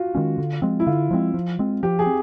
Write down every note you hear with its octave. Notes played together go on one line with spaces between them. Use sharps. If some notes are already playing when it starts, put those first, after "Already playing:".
Already playing: F4 F#4
D#3 G#3 C#4
D3
F3 G#3 C4
E4
D3 F4
F3 G#3 C4
F3
G#3 C4
F3 G4
G#4
C4